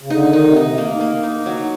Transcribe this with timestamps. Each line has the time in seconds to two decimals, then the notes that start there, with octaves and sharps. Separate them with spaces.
0.02 C#3
0.10 D3 D#4
0.28 D#3
0.33 D#4
0.44 C3
0.56 D#4
0.78 A#3
1.01 A#3
1.23 D#4
1.46 F#3